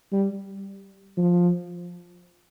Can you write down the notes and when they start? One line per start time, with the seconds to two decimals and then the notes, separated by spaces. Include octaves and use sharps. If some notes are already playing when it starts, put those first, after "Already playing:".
0.12 G3
1.17 F3